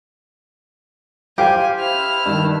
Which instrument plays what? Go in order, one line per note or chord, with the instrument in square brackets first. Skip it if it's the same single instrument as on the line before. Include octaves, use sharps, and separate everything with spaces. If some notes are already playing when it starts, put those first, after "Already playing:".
[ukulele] G4 [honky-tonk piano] C5 F5 [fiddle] G#5
[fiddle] E4 F6
[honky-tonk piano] G2 D#3 E7